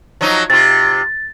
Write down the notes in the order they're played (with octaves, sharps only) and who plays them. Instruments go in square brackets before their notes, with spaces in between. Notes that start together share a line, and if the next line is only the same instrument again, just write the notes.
[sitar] F3 F#3 D#4
[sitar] C3 F4 [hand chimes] A6